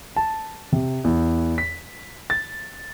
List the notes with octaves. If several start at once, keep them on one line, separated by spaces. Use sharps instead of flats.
A5
C3
E2
B6
A6